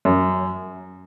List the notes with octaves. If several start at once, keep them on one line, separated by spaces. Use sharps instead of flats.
F#2